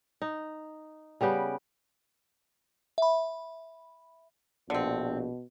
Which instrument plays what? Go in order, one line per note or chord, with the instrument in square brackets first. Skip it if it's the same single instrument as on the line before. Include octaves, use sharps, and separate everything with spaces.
[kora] D#4
C#3 G3 B3 G4
[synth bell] E5 B5
[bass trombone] A#1 [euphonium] B2 [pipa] D3 C4